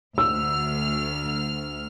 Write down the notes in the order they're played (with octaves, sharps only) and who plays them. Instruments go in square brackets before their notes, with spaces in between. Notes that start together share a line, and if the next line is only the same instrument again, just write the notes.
[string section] D2 F6 [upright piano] E6